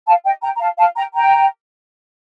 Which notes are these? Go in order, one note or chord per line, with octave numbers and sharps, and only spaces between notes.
F5 A5
D#5 G5
G5 A#5
A#5
F5 A5
F5 A5
G5 A#5
G5 A#5